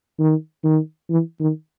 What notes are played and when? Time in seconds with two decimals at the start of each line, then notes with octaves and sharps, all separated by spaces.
0.20 D#3
0.64 D#3
1.10 E3
1.40 D#3